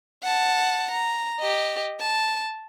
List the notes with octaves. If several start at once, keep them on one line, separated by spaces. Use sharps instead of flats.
F#5 A5
A#5
G4 D#5
A5